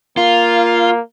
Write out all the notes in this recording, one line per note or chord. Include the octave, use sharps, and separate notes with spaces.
A#3 F4